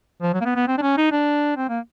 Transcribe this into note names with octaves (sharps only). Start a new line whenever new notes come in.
F3
F#3
A#3
B3
B3
C4
D4
C#4
D#4
D4
C4
A#3